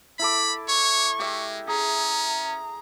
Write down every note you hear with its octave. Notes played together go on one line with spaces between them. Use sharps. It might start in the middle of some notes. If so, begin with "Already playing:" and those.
E4 A4 B5 D6
C#5 C#6
G#3 G4 E5
C#4 G#4 A#5